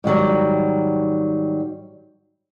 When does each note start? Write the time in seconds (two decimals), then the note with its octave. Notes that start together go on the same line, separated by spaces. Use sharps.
0.04 G#2 D#3 F#3 G3